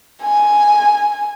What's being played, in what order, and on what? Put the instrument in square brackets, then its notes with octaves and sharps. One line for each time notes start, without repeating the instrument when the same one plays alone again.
[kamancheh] G#5